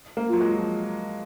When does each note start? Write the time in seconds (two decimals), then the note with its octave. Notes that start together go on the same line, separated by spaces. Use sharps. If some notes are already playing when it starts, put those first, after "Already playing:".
0.17 A#3
0.29 F#3 F4
0.41 G#3
0.58 F3